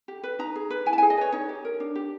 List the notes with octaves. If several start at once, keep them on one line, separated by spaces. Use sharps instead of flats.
G4
B4
D#4 A#5
G#4
B4
E4 G#5
A5
G#4 G#5
D#5
B4 C#5
D#4 C#5
G4
A#4
D4
G4